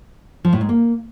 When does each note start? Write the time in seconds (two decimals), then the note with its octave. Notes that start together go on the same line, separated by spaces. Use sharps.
0.45 F3
0.53 A2
0.61 G#2
0.69 A#3